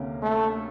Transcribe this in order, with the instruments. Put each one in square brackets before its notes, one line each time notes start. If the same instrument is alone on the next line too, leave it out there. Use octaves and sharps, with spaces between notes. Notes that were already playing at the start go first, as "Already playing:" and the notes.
Already playing: [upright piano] D2 C3 A#3 C#4
[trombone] A3